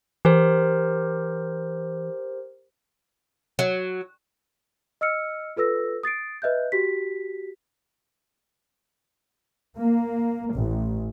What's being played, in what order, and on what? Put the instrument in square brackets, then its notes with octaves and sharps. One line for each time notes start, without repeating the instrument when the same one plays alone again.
[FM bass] E3 [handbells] G4 A#4 C5
[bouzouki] F#3
[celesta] D#5 E6 F6 C#7
F4 A4 B4 E6 A#6
D#6 A6 C7 D7
B4 D#5 E5 F#6 G6
F#4 G4 B6
[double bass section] A#3
A1